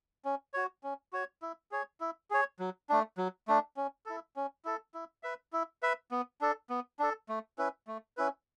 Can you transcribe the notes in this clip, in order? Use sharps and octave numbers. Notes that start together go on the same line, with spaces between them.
C#4
F#4 C#5
C#4
F#4 C#5
E4
G#4 C#5
E4
G#4 C#5
F#3
A3 D4
F#3
A3 D4
C#4
E4 A4
C#4
E4 A4
E4
B4 E5
E4
B4 E5
B3
D4 A4
B3
D4 A4
A3
C#4 E4 B4
A3
C#4 E4 B4